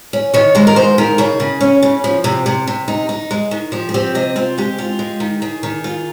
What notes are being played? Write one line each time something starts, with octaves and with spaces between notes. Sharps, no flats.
C#4
D#3 C#5
G#3 C5
A#4
G#2 C5
D#3 A#4
C#3 G#4
C#3
C#4
C#3
F3
C3
C3
C3
D#4
D#4
G#3
D#3
F3 G4
G#4
C4 G4
C3 D#5
C4 F4
G#3 G4
F4
G#3
D#3
D#3 G#4
D#3
F4